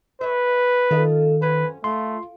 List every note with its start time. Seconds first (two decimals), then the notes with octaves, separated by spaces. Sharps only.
0.21 B4 C#5 E5
0.91 D#3 F4 A4 D#5
1.42 F#2 C#4 B4 C5
1.84 A3 F4 C6